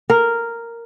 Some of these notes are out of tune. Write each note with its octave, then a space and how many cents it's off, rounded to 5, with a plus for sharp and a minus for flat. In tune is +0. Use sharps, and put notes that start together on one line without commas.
A#4 -5